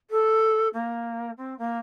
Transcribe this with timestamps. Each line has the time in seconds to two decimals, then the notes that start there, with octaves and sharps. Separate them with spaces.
0.10 A4
0.73 A#3
1.37 C4
1.58 A#3